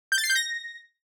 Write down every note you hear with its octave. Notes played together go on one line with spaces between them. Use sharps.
G6
A6
C7
G6
A#6